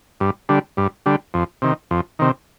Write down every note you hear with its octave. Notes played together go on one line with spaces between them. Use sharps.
G2
D3 G3
G2
D3 G3
F2
C3 D#3
F2
C3 D#3